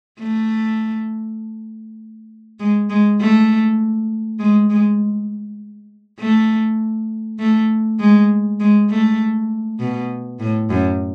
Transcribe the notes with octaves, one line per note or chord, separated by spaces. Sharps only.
A3
G#3
G#3
A3
G#3
G#3
A3
A3
G#3
G#3
A3
B2
A2
F#2